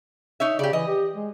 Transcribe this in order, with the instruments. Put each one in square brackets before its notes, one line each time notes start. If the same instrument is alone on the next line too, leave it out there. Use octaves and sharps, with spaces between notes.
[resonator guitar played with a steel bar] D#4 C#5 E5
[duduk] C#3 [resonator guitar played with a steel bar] G4 D5
[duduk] E3 [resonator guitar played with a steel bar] D#5
[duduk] G4
G#3